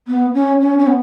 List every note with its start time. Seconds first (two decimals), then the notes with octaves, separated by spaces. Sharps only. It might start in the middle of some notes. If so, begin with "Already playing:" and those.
0.08 B3
0.34 C#4
0.60 C#4
0.78 C#4
0.87 B3